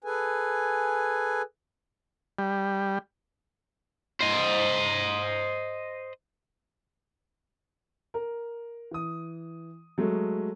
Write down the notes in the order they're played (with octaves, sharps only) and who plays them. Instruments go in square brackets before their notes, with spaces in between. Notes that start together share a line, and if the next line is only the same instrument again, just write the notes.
[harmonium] G#4 A4 B4 G#5
[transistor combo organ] G3
[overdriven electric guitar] C5 D#5
[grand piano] A#4
E3 D#6
F#3 G#3 A3